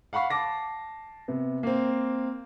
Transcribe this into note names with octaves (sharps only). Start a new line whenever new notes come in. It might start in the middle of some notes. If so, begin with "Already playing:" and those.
F5 F#5 B5 C#6 C7
A5 D6 A#6
C3 B3
A#3 C4